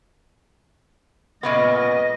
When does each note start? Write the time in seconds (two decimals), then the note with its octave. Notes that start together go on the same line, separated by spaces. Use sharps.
1.43 A#2 C#3 B3 D#5
1.77 D#5